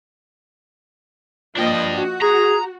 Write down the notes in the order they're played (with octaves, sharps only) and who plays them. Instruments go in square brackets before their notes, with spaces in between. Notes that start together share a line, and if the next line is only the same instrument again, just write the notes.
[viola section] F3 A#3 D#5 [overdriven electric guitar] D4 G5
[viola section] F#4
[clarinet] G#4 [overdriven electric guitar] A#5